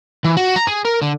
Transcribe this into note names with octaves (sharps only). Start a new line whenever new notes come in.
E3
F#4
A#5
G#4
A#4
D3